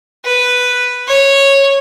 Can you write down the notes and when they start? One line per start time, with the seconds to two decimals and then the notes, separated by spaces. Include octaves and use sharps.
0.25 B4
1.08 C#5